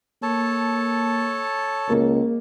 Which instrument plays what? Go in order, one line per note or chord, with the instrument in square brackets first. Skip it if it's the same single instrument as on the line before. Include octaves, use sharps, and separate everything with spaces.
[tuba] A#3 [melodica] A4 C#5 A5
[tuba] C#2 [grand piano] A#3